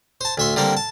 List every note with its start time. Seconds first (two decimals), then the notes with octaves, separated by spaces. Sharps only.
0.21 C5 A5
0.38 D2 E5 C6
0.56 D3 G3 A#3 C4
0.77 A5